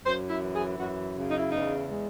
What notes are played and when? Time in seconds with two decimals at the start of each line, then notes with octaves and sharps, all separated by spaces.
0.05 F#2 C5
0.29 E4
0.42 E3
0.54 G#4
0.78 F#2 F#4
1.15 C#3
1.28 D#4
1.37 E4
1.47 E2 D#4
1.88 G#3